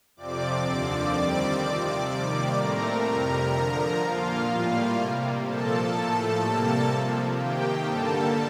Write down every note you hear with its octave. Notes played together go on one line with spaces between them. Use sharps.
F2 C3 F3 C4 D5 D6
D#2 D3 F3 C4
F2 D#3 G3 C4 D5 D6
C3 F3 C4 D5 D6
C3 D#3 G3 A#3
A2 A3 C4 A#4 A#5
F2 C3 G3 A#4 A#5
F2 D3 F3
A#2 F3 A#3 F4 F5
A2 G3 A#3 F4 F5
C3 G3 A#3
A#2 F3 A#3 A4 A5
A2 F3 A3
C3 G3 A#3
C3 F3 A#3
C3 D#3 A#3 G4 G5
G2 D3 G3 A#3 A4 A5